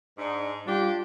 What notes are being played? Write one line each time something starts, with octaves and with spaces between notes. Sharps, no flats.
G#2 D4
G3 D4 F4 G4